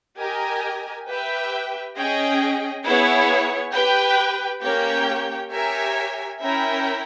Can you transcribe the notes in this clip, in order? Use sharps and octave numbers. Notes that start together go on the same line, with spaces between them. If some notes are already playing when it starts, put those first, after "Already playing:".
G4 A#4 D#5 G#5
G4 B4 E5 G5
C#4 G#4 D#5 G5
B3 E4 G#4 C#5
G4 B4 G5
A#3 C#4 G4 C#5 G5
G4 A#4 C#5 E5 G#5
C#4 E4 A#4 E5 G5